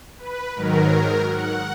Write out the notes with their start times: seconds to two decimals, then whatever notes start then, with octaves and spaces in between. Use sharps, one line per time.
0.18 B4
0.55 G#2 D#3 F#3 A#4
1.29 F#5